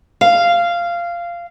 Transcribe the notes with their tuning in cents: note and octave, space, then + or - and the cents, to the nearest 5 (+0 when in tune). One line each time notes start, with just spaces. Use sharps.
F5 -15